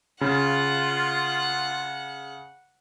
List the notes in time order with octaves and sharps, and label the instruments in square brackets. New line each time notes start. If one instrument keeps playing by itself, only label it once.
[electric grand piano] C#3 [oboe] F4 [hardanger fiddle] F#5